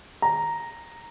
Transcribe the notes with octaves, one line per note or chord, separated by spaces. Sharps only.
A#5